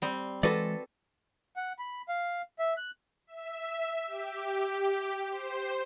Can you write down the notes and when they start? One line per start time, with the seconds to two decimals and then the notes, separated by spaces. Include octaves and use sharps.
0.02 G3 C4
0.43 E3 G#3 F#4 A4 B4 D5
1.56 F#5
1.79 B5
2.09 F5
2.59 E5
2.77 F#6
3.27 E5
4.07 G4
5.30 C5